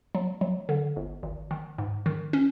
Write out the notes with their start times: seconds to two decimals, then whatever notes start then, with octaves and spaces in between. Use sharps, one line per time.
0.15 F#3
0.41 F#3
0.69 D3
0.96 G1
1.23 G#1
1.51 D#3
1.78 G#2
2.06 D#3
2.33 C#4